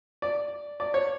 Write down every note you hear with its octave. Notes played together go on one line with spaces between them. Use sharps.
D5
D5
C#5